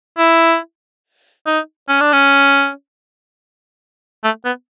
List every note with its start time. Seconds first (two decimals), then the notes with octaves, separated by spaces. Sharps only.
0.18 E4
1.46 D#4
1.89 C#4
2.01 D4
2.13 C#4
4.24 A3
4.45 B3